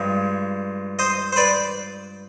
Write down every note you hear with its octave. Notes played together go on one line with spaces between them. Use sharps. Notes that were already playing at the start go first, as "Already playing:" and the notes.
Already playing: G2 F3 G#3
C5 D#5
C5
B4 D5